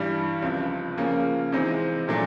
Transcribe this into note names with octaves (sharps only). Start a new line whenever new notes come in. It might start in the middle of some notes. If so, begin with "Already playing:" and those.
Already playing: G2 E3 G3
C#2 C3 F3
C#3 F3 A#3 C#4
C3 E3 G#3 C4 D#4
A#2 F#3 A3 D4